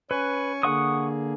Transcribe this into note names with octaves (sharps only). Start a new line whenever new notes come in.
C#4 B4 G#5 C#6
D3 A#3 G#4 F#5 C#6 D#6